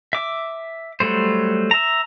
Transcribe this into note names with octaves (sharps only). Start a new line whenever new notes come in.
E5 D6
F#3 G3 A3 C5
E5 A#5